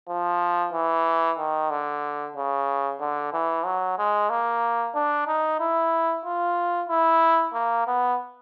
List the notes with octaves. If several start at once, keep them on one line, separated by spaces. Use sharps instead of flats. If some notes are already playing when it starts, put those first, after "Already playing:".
F3
E3
D#3
D3
C#3
D3
E3
F#3
G#3
A#3
D4
D#4
E4
F4
E4
A#3
B3